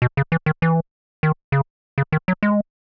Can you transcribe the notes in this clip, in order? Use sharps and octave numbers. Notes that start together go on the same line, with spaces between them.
B2
C#3
E3
D#3
E3
D#3
C#3
C#3
D#3
F#3
G#3